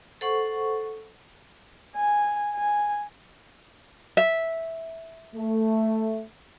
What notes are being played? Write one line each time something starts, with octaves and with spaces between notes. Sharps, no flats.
A4 C5 F#5 C#6
G#5
G#5
E5
A3